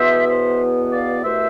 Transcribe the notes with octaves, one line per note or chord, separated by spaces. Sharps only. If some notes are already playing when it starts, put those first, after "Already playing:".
Already playing: E2 B2 B3 C5 E5
C5 E5
D5 F5
C2 B2 A3 C5 E5